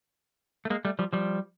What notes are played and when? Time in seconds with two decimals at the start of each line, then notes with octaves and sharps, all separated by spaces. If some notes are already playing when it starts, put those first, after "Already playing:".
0.65 A3
0.70 G#3 A#3
0.85 G3 A3
0.99 F3 G3
1.13 F3 G3